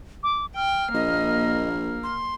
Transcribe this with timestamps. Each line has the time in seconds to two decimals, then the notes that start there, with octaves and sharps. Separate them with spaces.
0.23 D6
0.56 G5 F6
0.95 A#1 A#3 D#5
2.03 C6